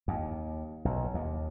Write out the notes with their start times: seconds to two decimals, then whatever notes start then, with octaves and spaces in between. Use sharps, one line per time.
0.08 D#2
0.85 B1
1.14 D#2